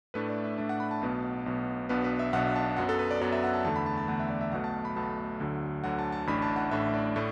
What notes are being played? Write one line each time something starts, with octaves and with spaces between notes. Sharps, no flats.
A2 A3 D4 B4
D5
E5
A2 A3 D4
F#5
B5
A5
B1 B2 B3
B1 B2 B3
B1 B2 B3 D4 B4
B4
E5
B1 B2 B3 D4 F#5
A5
F#2 F#3 B3 F#5
A4
B4
D5
F#2 F#3 B3 D5
E5
F#5
A5
E2 D3 A3 A5
B5
A5
A5
E2 D3 A3 F#5
E5
D5
E5
B1 B2 A3 F#5
A5
B5
B1 B2 A3 A5
D2 D3 F#3
D2 D3 F#3 F#5
A5
A5
A1 A2 A3 D4 B5
A5
F#5
A1 A2 A3 D4 E5
D5
A2 A3